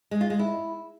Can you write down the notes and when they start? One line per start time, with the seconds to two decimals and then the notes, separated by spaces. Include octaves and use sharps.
0.11 G#3
0.21 F4
0.30 G#3
0.39 E4